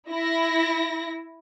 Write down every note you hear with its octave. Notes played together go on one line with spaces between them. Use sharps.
E4 A#6